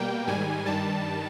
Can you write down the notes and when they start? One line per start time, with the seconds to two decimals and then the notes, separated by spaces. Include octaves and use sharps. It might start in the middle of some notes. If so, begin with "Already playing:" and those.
Already playing: B2 G3 A#3 G5
0.27 G#2 D#3 G3 G#5
0.66 G2 D#3 G3 A5